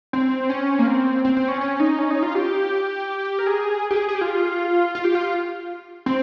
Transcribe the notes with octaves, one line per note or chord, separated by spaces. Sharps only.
C4
C#4
A#3
C4
C4
C4
C#4
C#4
D#4
C#4
D#4
F4
G4
A#4
G#4
G4
G#4
G#4
G4
F4
F4
G4
F4
C4